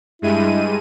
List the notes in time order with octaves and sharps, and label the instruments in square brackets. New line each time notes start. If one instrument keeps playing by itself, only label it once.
[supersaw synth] G2 G#3 D#7 [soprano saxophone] E4